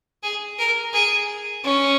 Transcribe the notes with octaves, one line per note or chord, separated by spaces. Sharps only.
G#4
A#4
G#4
C#4